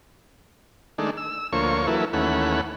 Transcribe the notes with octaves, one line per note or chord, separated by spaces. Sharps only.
D#3 G#3 A3 D4
E6
D2 F3 A#3 C#5 C#6
E3 F#3 A#3 E4 A4 B4
D#2 E3 A3 C#4 F#5 B5